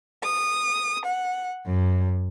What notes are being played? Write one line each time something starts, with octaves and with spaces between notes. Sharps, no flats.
D#6
F#5
F#2